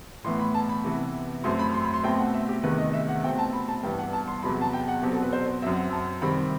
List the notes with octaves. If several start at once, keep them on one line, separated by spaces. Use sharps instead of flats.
A2 E3 B3 C6
B5
A5
B5
C3 E3 B3
F#2 F#3 A3 C4 C6
B5
C6
B5
C6
B2 A3 C4 G5
F#5
E5
G4
E2 C3 D#3 A3 B4
D#5
E5
F#5
B2 A3 C4 G5
A5
B5
A5
G2 E3 G3 B3 G5
F#5
A5
C6
E2 C3 F#3 B3 B5
A5
G5
F#5
B2 F#3 C4 G4
A4
B4
C5
F#2 F#3 C4 E5
F#5
A5
C3 D#3 G3 C4 B5